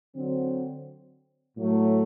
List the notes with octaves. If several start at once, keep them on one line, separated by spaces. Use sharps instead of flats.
D3 F#3 C4
A2 F#3 A3